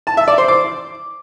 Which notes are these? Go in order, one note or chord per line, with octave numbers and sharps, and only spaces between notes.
A5
E5
D5
C5
D6